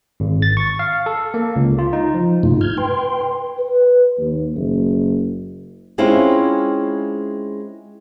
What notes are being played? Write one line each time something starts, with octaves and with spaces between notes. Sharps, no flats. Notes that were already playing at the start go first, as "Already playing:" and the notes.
G#1
A6
C#6
F5
A4
A#3
C#2
F4
D#4
F3
G2 C3 A3 D#4 F4
F6 G6 G#6
B4 G5 C6
B4
D#2
F#1
G#3 C4 C#4 E4 F4